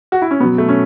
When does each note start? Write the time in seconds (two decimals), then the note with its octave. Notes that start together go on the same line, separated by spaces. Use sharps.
0.12 F#4
0.22 E4
0.31 C#4
0.40 B2 B3
0.43 F#3
0.58 A3
0.69 C#4